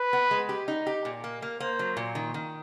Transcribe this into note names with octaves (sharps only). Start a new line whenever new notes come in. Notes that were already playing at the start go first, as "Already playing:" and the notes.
Already playing: B4
B3
G#3
G4
D#4
G4
A#2
A#3
A#3
A#3 C5
F#3
A#2
D#3
D#3